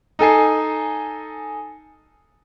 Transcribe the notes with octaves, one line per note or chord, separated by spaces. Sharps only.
D#4 A4 G#5 C7